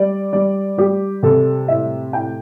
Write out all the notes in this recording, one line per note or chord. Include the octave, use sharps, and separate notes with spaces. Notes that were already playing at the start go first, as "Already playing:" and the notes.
Already playing: G3 D5
G3 D5
G3 G4
C3 A4
A2 E5
A2 G5